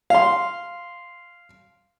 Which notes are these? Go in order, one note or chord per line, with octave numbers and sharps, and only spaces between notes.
F5 C6